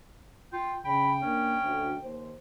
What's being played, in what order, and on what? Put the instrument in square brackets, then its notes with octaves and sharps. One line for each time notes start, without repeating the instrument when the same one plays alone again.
[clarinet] F4 [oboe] G5
[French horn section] C#3 [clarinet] G5 [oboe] B5
[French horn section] A#3 D4 [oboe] C#4
[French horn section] D2
D#2 C5